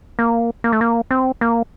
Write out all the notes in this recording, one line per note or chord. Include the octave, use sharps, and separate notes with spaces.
A#3
A#3
A3
A#3
C4
A#3